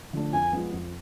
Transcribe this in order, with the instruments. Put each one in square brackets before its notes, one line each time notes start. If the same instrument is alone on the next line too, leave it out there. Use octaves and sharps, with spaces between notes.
[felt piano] D3 F3 A3 D4
[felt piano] F2 [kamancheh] G#5
[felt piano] F3 G#3 B3
F2